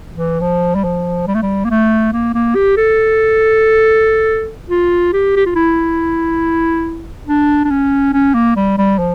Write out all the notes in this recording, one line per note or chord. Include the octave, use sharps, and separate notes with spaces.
E3
F3
G3
F3
G3
A3
G3
A#3
A3
A#3
A#3
G4
A4
F4
G4
G4
F4
E4
D4
D4
C#4
C#4
A#3
G3
G3
F3